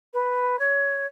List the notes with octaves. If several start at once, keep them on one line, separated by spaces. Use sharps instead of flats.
B4
C#5